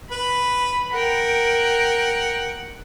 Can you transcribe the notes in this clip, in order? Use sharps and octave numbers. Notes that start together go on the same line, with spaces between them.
B4 B5
A#4 F#5 G5